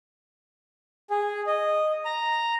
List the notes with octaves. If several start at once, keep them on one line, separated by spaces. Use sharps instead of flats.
G#4
D#5
A#5